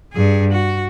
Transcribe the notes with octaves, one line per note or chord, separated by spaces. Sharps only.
G2 G#4
F#4